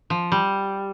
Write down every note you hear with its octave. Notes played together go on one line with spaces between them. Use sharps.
F3
G3